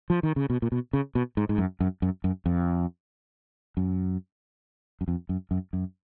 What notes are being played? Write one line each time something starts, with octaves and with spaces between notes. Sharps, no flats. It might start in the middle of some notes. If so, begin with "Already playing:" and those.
F3
D#3
C#3
B2
A#2
B2
C#3
B2
G#2
G#2
F#2
F#2
F#2
F#2
F2
F#2
F#2
F2
F#2
F#2
F#2